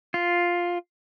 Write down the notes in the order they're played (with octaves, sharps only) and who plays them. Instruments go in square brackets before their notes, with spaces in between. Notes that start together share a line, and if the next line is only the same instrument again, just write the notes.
[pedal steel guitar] F4